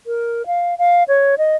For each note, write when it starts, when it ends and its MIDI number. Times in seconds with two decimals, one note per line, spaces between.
0.07 0.46 70
0.47 0.78 77
0.78 1.04 77
1.08 1.35 73
1.38 1.56 75